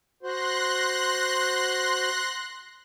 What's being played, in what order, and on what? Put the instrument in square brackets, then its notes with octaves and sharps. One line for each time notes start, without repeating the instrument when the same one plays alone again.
[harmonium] F#4 C5 [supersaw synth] C6 F#6 A#6